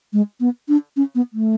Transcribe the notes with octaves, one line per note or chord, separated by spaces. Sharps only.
G#3
B3
D4
C#4
B3
A3